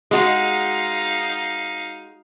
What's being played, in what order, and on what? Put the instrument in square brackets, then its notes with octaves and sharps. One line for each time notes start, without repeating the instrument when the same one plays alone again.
[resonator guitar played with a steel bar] G#3 F#4 [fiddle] D#4 F5